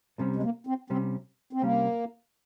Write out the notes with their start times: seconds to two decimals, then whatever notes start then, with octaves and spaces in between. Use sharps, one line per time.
0.18 C2 C3 G3 C#4
0.36 G#3
0.43 A#3
0.67 C4
0.90 C2 C3 G3 C4 C#4
1.53 C4
1.62 C2 C3 G3 A#3 C#4